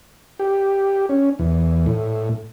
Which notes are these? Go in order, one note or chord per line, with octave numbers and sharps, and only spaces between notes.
G4
C#4
E2
A2